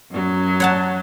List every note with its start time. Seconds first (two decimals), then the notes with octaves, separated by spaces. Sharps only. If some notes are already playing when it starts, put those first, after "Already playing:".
0.11 F#2 F#3
0.60 C#5 F#5 A5